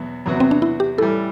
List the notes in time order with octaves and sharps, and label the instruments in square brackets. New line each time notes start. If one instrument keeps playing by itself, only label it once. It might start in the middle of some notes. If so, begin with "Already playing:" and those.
Already playing: [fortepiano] E2 B2 F#3 B3
E2 C3 F#3 B3 F#4
[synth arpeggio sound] C4
D4
E4
G4
[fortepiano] A2 E3 G3 [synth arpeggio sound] A4